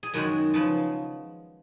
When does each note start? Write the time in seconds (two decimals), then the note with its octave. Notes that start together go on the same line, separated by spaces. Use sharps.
0.03 G#4
0.13 F#2 D#3 G#3 F#4
0.54 C#3 F3 B3